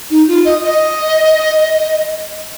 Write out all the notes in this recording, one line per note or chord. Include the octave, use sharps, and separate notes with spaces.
D#4
F4
D#5
D#5